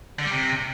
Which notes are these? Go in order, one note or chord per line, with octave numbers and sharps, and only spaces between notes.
D3
G3
C3